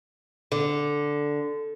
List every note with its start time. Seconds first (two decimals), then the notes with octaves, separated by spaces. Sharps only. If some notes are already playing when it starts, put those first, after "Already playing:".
0.52 D3